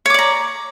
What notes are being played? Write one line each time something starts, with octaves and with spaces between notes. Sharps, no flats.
C#5 D5 A#5 D6